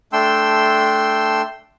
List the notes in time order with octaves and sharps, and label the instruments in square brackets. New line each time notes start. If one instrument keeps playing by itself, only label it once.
[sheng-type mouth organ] A3 D4 G5 C6 E6